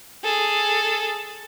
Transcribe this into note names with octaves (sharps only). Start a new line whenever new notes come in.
G#4 A4